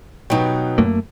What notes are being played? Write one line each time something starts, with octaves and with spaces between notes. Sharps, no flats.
B2 F#3 D#4 G5
F#2 A3 A#3